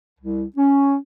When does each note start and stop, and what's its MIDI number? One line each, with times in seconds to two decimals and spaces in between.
0.20 0.44 36
0.57 0.95 61